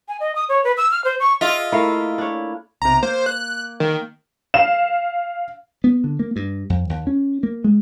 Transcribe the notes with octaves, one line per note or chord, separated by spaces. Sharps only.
G#5
D#5
D#6
C#5
B4
E6
F6
C5
C#6
F4 G#4 D#5 E5
A3 A#3 E4 F5
D4 C#5
B1 C3 A#5
A#3 C5
F#6
D#3
F5 E7
B3
D3
A#3
G2
F2
D#2
C#4
A#3
G#3